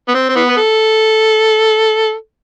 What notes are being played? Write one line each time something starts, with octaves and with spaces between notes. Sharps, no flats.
B3
C4
C4
E3 B3
B4
A4